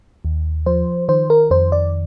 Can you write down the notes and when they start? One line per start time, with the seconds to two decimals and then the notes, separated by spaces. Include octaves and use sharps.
0.25 D#2
0.66 F3 C5
1.08 D#3 C5
1.30 A#4
1.51 F2 C5
1.72 D5